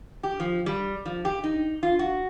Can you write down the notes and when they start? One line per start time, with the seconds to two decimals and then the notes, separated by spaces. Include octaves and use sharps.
0.23 G4
0.40 F3
0.66 G3
1.05 F3
1.25 G4
1.44 D#4
1.83 F4
1.99 F#4